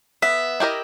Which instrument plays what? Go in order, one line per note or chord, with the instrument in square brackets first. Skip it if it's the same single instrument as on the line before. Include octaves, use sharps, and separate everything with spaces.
[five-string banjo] B3 [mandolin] E5
[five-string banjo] E4 G4 A#4 D#5